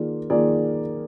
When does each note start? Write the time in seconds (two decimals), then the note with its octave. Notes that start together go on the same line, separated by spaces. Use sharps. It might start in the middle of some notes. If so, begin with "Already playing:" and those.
Already playing: D#3 A#3 F4 G#4 D5
0.30 D#3 A#3 F4 G#4 D5